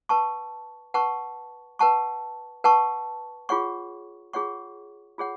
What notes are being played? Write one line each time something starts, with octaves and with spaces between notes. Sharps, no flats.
B4 F#5 A5 C#6
B4 F#5 A5 C#6
B4 F#5 A5 C#6
B4 F#5 A5 C#6
F4 G#4 C#5 F#5 C#6
F4 G#4 C#5 F#5 C#6
F4 G#4 C#5 F#5